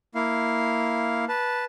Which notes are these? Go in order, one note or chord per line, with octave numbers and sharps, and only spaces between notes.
A#3 E4 F5
B4 A5